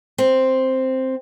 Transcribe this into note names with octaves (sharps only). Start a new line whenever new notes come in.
C4